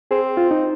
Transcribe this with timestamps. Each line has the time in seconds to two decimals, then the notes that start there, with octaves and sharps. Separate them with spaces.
0.11 C4 G#4
0.37 F4
0.51 D#4